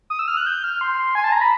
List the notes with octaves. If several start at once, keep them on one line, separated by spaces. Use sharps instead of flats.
D#6
E6
F6
F#6
G6
F6
C6
G#5
A5
A#5
B5